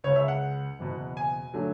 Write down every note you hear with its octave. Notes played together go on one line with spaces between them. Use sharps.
C#2 C#3 G#3 C#5
E5
F#5
F#1 E2 B2
G#5
D3 F#3 A3